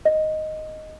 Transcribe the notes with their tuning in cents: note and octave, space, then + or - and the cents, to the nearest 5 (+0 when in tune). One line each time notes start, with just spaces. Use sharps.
D#5 +0